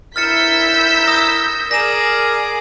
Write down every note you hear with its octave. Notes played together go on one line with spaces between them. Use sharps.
E4 A#4 E6 F6 G6 A6 B6 C#7
D#6 A#6
G#4 A#4 D5 A#6 E7